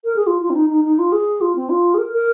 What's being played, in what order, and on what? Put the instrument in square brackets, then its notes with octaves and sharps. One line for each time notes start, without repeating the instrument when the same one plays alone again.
[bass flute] A#4
G#4
F4
F4
C4
D#4
D#4
D#4
F4
G#4
F4
C4
F4
G#4
A#4
A#4